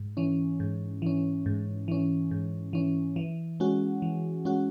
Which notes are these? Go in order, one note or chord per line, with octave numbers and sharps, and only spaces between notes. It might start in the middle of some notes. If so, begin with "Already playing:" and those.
Already playing: G#2
E3 C#4
G#2
E3 C#4
G#2
E3 C#4
G#2
E3 C#4
E3
G#3 C#4 F#4
E3
G#3 C#4 F#4